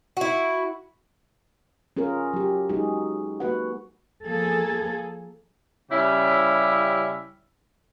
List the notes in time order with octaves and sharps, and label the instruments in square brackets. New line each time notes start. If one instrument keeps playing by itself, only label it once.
[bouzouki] E4 F#4
[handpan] C#4 F4 G#4 A#4
F#3 G4
F#3 G#3 D#4 F#4 G#4
A#3 F#4 B4 F#5
[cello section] F3 A#3 G#4 A4
[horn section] C#3 G3 C#4 E4 G4